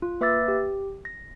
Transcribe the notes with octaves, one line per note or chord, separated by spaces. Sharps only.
F4
A#3 B4 E5 D6 E6 A6
G4
A#6